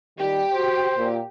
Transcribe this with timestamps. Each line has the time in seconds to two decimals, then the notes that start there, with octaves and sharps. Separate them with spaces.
0.19 A#2 D#3 G3 G4
0.54 F#4 C5
0.97 A#2